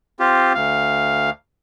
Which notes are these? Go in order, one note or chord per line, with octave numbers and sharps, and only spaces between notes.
C4 F4 G4
D2 F5